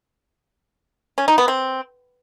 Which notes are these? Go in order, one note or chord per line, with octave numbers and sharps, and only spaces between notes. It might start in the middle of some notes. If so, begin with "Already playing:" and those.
C#4
D#4
B3
C4